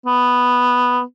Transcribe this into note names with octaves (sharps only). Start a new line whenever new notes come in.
B3